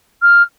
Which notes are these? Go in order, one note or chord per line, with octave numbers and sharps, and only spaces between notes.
F6